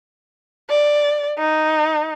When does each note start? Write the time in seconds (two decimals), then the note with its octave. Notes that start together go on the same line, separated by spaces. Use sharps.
0.69 D5
1.38 D#4